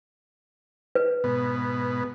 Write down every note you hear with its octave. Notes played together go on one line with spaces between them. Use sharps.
B4
G#2 B2 B3